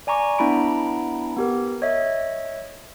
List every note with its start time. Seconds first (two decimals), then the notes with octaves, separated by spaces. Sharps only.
0.07 D5 G#5 A#5 C#6 D6
0.39 B3 D4 E4 A#5 B5 D7
1.36 B3 G4 A#4
1.82 C#5 D#5 E5